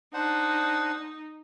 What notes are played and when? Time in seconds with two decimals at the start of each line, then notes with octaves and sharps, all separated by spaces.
0.14 D4 D#4 C5 F#5